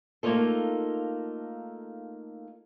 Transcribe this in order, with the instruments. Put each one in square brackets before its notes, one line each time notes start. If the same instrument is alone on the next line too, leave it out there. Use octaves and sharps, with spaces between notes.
[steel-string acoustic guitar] A3 A#3 C4 D#4 F4 A4